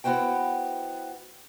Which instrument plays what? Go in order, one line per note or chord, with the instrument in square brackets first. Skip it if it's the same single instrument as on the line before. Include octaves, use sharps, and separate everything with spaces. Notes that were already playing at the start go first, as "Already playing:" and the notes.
[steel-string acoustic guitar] B3 E4 F#4 C5 G5